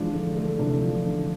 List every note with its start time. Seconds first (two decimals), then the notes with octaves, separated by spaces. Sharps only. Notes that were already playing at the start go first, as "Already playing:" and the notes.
Already playing: E3 F3 G#3 D4
0.14 D3
0.36 A3
0.59 C3 E3 D4
0.82 F3
1.06 D3